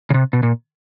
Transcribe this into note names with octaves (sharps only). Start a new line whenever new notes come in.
C#3
C3
B2
A#2